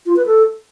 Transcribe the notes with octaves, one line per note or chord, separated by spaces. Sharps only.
F4
B4
A4